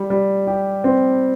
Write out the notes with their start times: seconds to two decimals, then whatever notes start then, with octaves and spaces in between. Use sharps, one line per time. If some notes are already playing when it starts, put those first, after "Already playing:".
Already playing: G3
0.10 G3
0.47 G4
0.84 C4